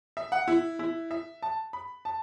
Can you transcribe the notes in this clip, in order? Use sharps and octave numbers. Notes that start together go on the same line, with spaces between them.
E5
F#5
E4
E4
E5
A5
B5
A5